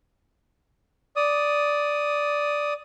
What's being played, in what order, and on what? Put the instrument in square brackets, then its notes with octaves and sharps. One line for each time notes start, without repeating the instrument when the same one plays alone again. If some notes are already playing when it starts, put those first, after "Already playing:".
[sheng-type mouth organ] D5 D#6